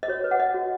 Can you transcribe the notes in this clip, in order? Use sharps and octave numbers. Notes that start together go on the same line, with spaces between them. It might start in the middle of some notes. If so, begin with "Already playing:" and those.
D#5
F#4 C#5
B4
F#5
B4 D#5
F#4